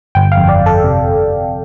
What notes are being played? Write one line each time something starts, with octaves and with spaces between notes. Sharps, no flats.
G1 G5
F5
F2
D5
F2
A4
C3
G1
G1